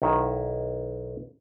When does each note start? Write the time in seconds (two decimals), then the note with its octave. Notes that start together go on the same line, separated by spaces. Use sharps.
0.02 B1 D#3 E4 F#4